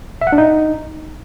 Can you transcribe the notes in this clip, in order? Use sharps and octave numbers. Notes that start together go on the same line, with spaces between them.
E5
F#5
D4
D#4